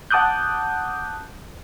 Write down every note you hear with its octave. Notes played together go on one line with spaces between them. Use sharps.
F#5 A5 D6 D#6 F#6 G6